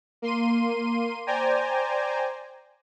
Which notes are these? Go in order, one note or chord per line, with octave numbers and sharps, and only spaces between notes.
A#3 C6 D#7
C5 D5 G5 G#5 A#5